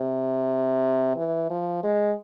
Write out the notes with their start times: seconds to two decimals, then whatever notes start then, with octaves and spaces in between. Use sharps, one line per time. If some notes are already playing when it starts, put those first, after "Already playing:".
Already playing: C3
1.17 E3
1.50 F3
1.83 G#3